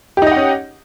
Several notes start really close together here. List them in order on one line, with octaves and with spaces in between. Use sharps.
G4 D#4 D#5 F#5 C#4